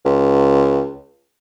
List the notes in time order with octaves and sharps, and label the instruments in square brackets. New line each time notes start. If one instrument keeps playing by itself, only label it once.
[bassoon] C#2